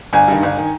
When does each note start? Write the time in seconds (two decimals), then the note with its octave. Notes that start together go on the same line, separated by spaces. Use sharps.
0.13 G1 G#5
0.28 G2 D#3
0.43 G1
0.57 D#3